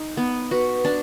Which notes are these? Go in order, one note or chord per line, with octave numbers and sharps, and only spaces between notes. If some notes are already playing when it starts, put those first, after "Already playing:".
Already playing: D#4
B3
F#4 B4
D4